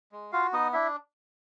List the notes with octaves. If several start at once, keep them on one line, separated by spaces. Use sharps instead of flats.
G#3
F4 F#4 F5
B3 D#4 D#5
D4 E4 E5